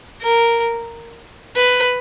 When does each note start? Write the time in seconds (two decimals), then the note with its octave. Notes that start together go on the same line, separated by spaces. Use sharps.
0.22 A#4
1.55 B4